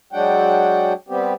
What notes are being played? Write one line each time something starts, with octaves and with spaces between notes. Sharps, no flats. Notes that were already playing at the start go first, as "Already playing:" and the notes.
F#3 G#3 D4 F#4 F#5 G5
G3 B3 C4 G4